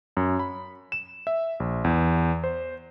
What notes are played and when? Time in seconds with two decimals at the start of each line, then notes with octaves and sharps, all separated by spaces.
0.17 F#2
0.39 B5
0.92 E7
1.27 E5
1.60 A#1
1.84 E2
2.44 C5